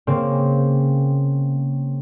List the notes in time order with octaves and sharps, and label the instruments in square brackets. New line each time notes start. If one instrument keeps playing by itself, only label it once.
[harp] C#3 A#3 C4